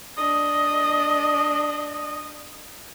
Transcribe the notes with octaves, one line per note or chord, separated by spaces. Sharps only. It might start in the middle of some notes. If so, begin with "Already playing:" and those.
D4 D#5